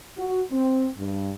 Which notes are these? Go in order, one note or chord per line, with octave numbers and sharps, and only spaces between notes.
F#4
C4
G2